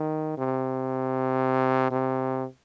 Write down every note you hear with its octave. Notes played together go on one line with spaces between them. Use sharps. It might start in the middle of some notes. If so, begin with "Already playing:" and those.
Already playing: D#3
C3
C3